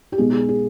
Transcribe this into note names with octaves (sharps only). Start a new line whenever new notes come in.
G4
B1 B2 G#3 G#4
G#4
G#4